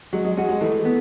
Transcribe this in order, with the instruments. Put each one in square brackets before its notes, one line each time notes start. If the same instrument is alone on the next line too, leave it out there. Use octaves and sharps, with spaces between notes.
[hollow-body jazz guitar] F#3 [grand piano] G#3
[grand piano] G#3
[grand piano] G#3 [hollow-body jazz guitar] C#4 F#4
[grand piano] G#3
[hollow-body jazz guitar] E3 [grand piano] A3
[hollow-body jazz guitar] B3